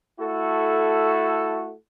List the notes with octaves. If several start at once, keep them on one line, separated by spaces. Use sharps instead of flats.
A3 E4 F#4 A4